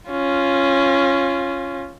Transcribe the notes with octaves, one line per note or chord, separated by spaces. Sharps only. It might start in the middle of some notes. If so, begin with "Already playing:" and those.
C#4 F4